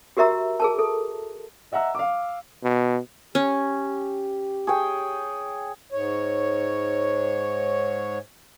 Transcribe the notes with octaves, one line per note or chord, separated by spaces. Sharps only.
F#4 G4 A#4 E5 A#5 E6
G#4 A#4 A5
A4
D#5 E5 F#5 A#5 E6
F5 D6
B2
C#4 G4
G#4 C#5 G5
G#2 C#5